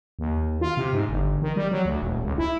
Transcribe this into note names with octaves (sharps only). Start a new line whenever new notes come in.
D#2
F4
C3
G#2
G1
D#3
G3
F#3
D2
D#1
C#2
E4